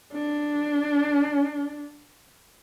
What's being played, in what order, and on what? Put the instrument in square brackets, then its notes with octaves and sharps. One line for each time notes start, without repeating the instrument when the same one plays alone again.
[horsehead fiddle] D4